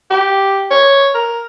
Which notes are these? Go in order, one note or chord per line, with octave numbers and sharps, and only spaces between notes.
G4
C#5
A#4